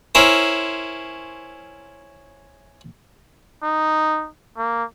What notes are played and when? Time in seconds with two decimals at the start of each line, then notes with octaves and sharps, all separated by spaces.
0.15 C#4 E4 A#4 C5
3.63 D#4
4.57 A#3